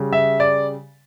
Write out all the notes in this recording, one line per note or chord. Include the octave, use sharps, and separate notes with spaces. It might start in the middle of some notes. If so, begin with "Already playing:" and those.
Already playing: C#3 G3
E5
D5